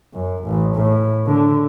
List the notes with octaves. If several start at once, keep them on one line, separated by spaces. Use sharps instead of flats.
F#2
A1
A2
D3